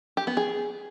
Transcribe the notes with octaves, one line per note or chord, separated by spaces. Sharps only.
G4
B3
G#4